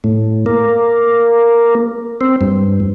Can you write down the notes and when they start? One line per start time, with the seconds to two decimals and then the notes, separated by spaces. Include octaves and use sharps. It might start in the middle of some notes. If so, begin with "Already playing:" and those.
0.04 A2
0.46 A#3
2.21 C4
2.41 G2